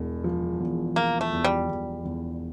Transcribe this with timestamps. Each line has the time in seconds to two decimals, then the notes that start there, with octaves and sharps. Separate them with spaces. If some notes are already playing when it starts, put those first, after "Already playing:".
Already playing: E1 E2
0.24 F3
0.60 E2
0.96 F3 A#3
1.21 A3
1.33 E2
1.44 G3
1.69 E2
2.05 E2